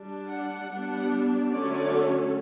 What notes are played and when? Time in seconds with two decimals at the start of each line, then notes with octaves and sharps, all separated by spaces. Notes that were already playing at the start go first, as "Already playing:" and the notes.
Already playing: G3 D4
0.30 F#5
0.70 G3 B3 D4 F#5
1.52 D3 F#3 A3 C#4 D5
1.92 A4